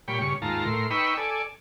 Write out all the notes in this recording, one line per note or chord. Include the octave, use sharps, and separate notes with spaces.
A#2 G3 C#5 G5 B5
G2 C#3 C#6
D#2 G#2 F4 A5 A#5
A2 A#4 C6
D#4 B4 G5 B5 C#6 E6
A4 D5 G#5